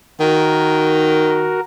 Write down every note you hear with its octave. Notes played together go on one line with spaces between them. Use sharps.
D#3 F#4 A#4